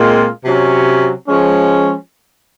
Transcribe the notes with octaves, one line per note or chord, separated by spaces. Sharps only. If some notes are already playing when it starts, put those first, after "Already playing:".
Already playing: A#2 G#3 C4 F4
C3 F#3 C#4
F3 G#3 C#4